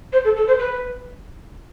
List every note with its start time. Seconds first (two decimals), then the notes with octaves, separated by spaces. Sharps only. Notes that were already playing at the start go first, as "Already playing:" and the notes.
0.12 C5
0.24 A4
0.36 A4
0.47 C5
0.59 B4